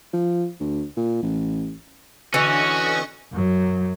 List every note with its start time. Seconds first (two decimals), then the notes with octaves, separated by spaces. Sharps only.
0.13 F3
0.60 D2
0.97 A#2
1.23 A1
2.34 D3 E3 C#4 F#4 D#5 C#6
3.32 F#2 F#3